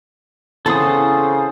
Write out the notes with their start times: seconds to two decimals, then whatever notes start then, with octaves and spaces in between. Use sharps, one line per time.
0.66 C#3 E3 B3 C4 A4 C5 D#6